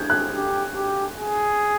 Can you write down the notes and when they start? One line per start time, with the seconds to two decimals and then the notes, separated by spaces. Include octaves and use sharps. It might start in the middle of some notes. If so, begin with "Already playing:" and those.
Already playing: G6 G#6
0.10 F#6
0.32 G4
0.75 G4
1.18 G#4